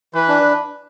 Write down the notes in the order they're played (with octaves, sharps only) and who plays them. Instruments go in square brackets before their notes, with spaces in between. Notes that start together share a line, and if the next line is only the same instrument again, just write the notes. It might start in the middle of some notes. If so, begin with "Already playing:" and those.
[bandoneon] E3 [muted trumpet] B4
[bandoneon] D4